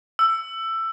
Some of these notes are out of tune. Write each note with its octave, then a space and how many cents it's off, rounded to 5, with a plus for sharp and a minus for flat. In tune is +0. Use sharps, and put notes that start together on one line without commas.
E6 +15